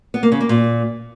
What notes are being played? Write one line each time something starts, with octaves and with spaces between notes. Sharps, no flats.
B3
A#3
C#3
A#3
A#2